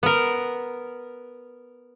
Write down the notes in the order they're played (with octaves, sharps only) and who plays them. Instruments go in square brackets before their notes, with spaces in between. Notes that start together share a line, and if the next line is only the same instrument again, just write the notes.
[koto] B3 A#4